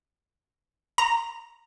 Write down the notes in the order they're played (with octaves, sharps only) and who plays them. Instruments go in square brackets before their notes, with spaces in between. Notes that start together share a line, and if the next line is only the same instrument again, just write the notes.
[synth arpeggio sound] A#5